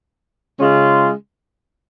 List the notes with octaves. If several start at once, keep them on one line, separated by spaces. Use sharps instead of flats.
C#3 G#3 C#4 F4